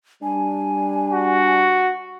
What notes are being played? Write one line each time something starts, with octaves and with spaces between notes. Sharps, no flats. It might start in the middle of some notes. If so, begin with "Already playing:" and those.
G3 D4 G#5
F#4